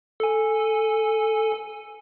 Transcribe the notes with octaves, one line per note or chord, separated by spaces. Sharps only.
A4 G#5